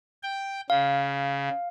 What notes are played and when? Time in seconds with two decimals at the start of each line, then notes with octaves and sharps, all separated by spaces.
0.23 G5
0.70 C#3 F5